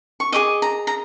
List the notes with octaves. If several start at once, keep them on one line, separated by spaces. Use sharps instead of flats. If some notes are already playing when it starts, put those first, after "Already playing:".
C#6
G#4 C5 D#5 D6
A#5
A#5